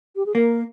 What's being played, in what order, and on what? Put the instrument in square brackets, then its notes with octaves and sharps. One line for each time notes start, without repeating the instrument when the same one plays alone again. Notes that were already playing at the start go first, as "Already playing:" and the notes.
[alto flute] G4
G#4
[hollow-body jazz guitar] A#3 [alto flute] A#4